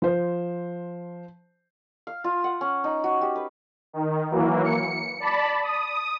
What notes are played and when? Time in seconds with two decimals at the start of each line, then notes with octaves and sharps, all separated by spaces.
0.02 F3 C5
2.07 F5
2.24 F4
2.44 F#5
2.61 C#4
2.84 D#4
3.04 F#4
3.21 G4
3.36 B4
3.93 D#3
4.31 E3 F#3 A#3
4.64 C#7
5.20 D5 A5 B5
5.63 D#6